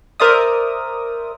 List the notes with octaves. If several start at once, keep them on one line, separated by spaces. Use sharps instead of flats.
A#4 C5 D5 E5 D#6